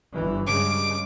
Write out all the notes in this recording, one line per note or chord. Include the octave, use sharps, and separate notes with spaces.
G1 E3
G2 C#3 G#3 D6